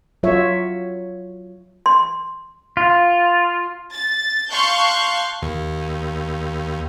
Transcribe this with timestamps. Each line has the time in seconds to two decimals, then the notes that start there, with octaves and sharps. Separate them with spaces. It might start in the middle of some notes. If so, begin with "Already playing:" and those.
0.23 F#3 F4 C#5 E5
1.86 C6
2.77 F4
3.92 A6
4.52 F5 A5 C6 C#6 F#6 G6
5.42 D#2